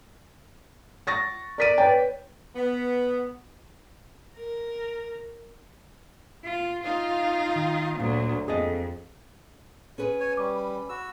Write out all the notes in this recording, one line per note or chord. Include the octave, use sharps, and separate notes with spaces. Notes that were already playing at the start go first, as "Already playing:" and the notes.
C#6 A6 A#6
A#4 D5 B6 D#7
B4 C#5 G5
B3
A#4
F4
D#4 F4 F5
D#3
D2 A#2 F#3
F2 G#4 A4 D#5
C#4 G#4 B4
C#5 G#5
G3 C#6 D6
B5
F#4 E6